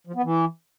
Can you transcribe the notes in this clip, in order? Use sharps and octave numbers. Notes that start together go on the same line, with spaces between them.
F3
B3
E3